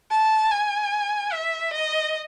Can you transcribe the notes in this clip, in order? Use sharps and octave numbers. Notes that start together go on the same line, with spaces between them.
A5
G#5
E5
D#5